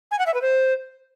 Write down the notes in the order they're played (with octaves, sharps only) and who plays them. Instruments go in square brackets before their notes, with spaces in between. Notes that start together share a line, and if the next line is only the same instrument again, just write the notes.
[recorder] G#5
F#5
E5
B4
C5